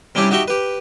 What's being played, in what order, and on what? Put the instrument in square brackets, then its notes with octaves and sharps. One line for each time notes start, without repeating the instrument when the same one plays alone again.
[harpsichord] C3 G3 C#4 D4 E4 G4
D#4 F#4 G4 E5 G5 C#6
G4 B4